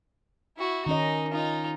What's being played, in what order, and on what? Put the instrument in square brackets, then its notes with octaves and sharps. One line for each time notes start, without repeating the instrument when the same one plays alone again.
[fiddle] E4 F#4
[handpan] D#3 C#4 D#5 [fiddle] D#4
[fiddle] D#4 F4